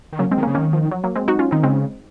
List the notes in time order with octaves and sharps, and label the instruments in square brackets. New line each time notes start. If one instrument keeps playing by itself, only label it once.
[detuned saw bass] D#3
[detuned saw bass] C#3 [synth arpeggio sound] F#3 A#3
[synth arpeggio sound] G#3 C4
[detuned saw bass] D#3
[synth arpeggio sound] A#3 C#4
[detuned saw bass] C#3
[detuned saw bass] D#3 [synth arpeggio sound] A#3 C#4
[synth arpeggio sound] F3
F#3
F#3 A#3
G#3 C4
D#4 F#4
C#4 F4
[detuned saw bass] D#3 [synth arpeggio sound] C4 D#4
[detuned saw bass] C#3 [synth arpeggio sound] G#3 C4